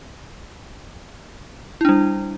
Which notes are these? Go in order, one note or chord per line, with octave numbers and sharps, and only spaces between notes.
G3 D4 E4